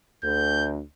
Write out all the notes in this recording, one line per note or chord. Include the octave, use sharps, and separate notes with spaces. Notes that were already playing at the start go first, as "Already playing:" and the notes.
D2 G6